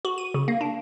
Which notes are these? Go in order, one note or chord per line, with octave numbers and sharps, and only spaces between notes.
F#4
D#7
C#3
A#3
D4